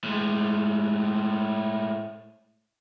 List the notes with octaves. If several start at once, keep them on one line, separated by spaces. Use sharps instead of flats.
A2 G#3